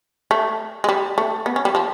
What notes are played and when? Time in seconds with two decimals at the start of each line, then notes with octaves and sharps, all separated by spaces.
0.31 A3
0.84 G#3
0.89 G3
1.18 A3
1.46 B3
1.56 C#4
1.65 G3
1.75 F3